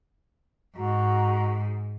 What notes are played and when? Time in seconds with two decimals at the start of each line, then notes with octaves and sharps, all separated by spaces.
0.76 G#2 F#4 D#5 A#5